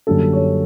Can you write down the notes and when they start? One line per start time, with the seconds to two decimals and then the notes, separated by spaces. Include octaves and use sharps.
0.07 F#2 D3 G3 A#3 D4 A4
0.33 C#5